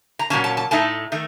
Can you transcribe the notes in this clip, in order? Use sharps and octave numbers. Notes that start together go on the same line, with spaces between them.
A#5
A#2 F#3 A#3 C#4 A5
A5
A5
A2 A3 D#4 A5
D#3 A3